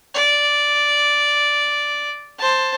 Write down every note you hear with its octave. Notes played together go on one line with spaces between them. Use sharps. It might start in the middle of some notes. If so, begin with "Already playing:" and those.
D5
C5 A5